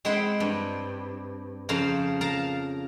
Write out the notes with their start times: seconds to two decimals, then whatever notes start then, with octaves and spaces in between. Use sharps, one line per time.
0.05 G#3 C4 E4 C5 F#5 G5
0.40 G2
1.69 F2 C#3 C5 F5 A#5 C6
2.21 A#4 F5 A5 A#5